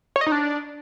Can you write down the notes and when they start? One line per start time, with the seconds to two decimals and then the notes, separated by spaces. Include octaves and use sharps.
0.16 C#5
0.21 D#5
0.27 D#4
0.32 D4